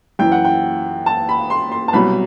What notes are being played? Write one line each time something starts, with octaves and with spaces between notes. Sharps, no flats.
F#2 E3 G5
F#5
G5
A5
B5
C6
C6
A5
C2 B2 F#3 B5